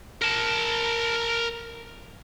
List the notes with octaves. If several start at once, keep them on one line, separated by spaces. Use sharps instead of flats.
A#4 A5